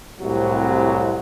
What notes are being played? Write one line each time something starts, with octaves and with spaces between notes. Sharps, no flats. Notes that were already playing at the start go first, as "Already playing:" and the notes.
C2 A2 C3 F#3